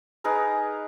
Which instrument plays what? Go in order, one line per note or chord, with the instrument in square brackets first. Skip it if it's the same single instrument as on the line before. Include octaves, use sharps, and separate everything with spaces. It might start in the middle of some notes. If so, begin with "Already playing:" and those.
[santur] D#4 G#4 A#4 B4